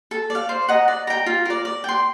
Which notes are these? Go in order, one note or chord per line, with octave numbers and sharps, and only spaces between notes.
A4
D5
F5
C5
D#5 F#5 A#5
D5
G5 A#5
F4
A#4 D5
D5
G5 C6